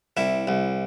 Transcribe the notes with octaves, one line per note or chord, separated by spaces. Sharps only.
C2 E4
C2